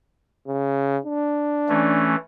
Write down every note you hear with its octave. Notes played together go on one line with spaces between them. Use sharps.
C#3
D4
E3 A3 C#4